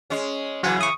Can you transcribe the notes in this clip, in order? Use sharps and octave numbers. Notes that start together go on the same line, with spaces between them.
G#3 C#4
C#3 E3 F#3 F#5 G#5
C#6 D#6